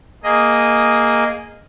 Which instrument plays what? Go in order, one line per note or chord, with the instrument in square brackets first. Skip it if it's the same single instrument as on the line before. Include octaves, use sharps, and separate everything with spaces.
[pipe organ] A#3 G#4 D#5